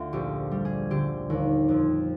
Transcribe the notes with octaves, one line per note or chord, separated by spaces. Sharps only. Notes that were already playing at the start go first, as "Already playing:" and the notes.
Already playing: D2 F4
A#1 G4
G3
G#4
D3 G4
D#2
F2